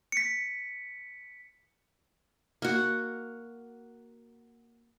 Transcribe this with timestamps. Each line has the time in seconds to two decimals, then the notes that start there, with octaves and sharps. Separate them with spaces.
0.12 B6 C#7
2.62 A#3 F#4